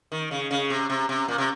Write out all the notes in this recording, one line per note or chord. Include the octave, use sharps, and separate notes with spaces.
D#3
C#3
C#3
C3
C3
C3
A#2
C3